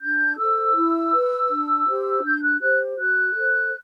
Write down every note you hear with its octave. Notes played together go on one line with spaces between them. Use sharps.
D4 G6
A4 C5 E6
E4
B4
D4
G4 C5
D4 G6
F#6
G4 C5 F#6
F#4 F#6
A4 C5